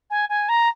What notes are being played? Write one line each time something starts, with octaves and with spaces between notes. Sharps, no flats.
G#5
G#5
A#5